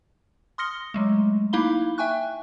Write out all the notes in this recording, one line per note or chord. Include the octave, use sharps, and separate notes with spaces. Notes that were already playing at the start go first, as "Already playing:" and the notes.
C6 D#6 F6 A#6 C#7 G7
F#3 G#3 A3
A#3 D#4 E4 F5 B5 G7
E5 G5 G#5 C#6 F#6